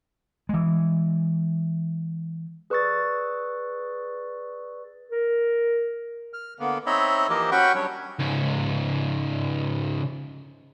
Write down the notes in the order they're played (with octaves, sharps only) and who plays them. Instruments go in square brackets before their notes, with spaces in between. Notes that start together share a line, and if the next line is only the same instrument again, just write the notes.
[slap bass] E3 G#3
[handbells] G#4 B4 D5 C#6 E6 A6
[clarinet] A#4
[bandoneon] F6
D3 A#3 B3
C4 D#4 C#5 D#5 E5 B5
E3 F3 A#3 G4 A#4 D#5
C#4 F#4 F#5 G5 B5 C#6
F#3 G3 D4 C#5
[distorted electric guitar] C#2 G#2